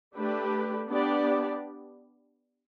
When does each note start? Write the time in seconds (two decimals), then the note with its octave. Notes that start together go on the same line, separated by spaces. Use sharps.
0.15 A3 D4 G4 B4
0.87 B3 D4 G4 D5